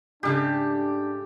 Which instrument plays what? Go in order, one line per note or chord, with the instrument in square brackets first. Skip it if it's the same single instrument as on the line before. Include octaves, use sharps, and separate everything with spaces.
[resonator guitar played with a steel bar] G#2 C#3 A3 [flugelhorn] D4 [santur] G4